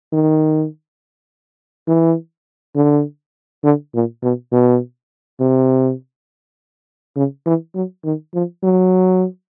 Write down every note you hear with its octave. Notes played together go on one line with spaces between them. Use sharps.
D#3
E3
D3
D3
A#2
B2
B2
C3
C#3
E3
F#3
D#3
F3
F#3